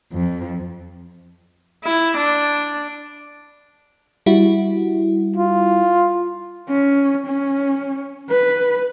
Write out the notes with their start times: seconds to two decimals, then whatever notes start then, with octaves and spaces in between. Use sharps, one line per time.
0.12 F2
1.84 E4
2.17 D4
4.26 G3 E4 F#4
5.36 F4
6.69 C#4
7.26 C#4
8.30 B4